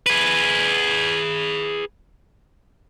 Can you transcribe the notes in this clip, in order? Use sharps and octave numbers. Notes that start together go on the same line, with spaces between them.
G#4 B4